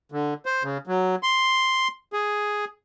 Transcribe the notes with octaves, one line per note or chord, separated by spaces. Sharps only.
D3
C5
C#3
F#3
C6
G#4